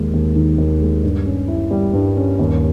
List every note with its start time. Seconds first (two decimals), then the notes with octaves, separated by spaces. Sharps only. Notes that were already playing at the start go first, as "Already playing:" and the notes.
Already playing: D#2 G#3
0.14 D#2
0.36 D#3
0.58 D#2
0.82 G#3
1.03 G2
1.26 C#4
1.48 E4
1.71 G3
1.93 G2
2.17 C#4
2.39 D#2